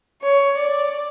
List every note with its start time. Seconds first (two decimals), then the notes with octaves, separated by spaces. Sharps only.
0.21 C#5
0.59 D5